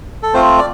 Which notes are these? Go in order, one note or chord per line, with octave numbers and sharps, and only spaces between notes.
A4
A3 C4 F4 C5
D5